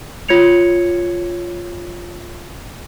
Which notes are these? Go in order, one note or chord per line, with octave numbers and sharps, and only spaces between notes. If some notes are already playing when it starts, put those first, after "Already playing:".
F4 C#5 G#6 C#7 F7